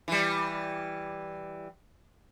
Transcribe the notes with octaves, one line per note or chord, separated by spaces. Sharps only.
E3 G3